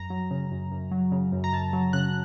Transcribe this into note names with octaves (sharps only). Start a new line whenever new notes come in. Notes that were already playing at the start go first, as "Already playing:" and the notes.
Already playing: F#2 A#5
F#3
C#3
F#2
F#2
F#3
C#3
F#2
A#5
F#2 A5
F#3
C#3 F#6